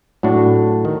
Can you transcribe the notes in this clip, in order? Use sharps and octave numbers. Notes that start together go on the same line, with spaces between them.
A2 F#3 A3 D4 F#4
D#3